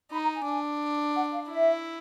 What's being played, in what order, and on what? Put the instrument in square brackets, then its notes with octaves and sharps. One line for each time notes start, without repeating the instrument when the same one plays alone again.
[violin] D#4 [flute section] B5
[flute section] A#5
G#5
[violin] D4
[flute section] F#5
F5
[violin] E4 [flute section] E5